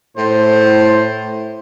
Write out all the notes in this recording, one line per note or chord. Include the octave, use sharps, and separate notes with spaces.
A2 C5